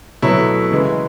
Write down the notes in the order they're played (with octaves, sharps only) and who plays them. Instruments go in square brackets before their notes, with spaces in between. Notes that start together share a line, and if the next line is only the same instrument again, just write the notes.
[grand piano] B2 F#3 A3 E4
C#3 E3 G#3